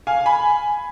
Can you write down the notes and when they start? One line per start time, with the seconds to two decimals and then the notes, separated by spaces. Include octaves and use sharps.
0.07 F5 G#5
0.26 G#5 B5